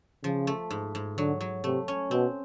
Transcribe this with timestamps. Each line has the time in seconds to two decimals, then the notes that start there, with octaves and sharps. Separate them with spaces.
0.24 C#3 F3
0.47 A3
0.70 G#2
0.95 G#2
1.18 D3 F#3
1.41 F#3
1.64 C3 A3
1.88 C#4
2.11 B2 C4